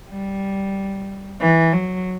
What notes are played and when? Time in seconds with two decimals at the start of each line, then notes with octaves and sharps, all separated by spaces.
0.11 G3
1.41 E3
1.73 F#3